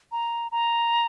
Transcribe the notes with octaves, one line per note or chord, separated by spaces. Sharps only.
A#5
A#5